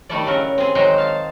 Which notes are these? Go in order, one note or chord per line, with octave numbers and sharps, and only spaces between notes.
D#3 G3 A3 E4 A4 D5
C#3 F#3 A#4
C4 G#4
D#3 F#3 G#3 D#4 C5 G5
F5 A5